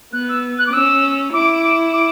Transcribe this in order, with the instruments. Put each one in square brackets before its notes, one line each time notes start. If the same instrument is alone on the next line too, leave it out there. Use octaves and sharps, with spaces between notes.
[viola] B3 [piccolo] F#6
[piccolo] E6
F#6
D6
[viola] C#4 [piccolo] E6
[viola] E4 [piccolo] D6
[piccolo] D6